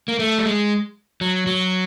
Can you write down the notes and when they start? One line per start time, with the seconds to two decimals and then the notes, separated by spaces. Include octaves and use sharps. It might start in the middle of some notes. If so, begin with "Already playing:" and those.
0.08 A#3
0.19 A3
0.38 G3
0.46 G#3
1.21 F#3
1.47 F#3